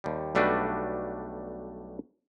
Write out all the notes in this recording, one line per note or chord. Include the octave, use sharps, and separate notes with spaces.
D#2 G3
B1 G3 A3 D4 F#4 B4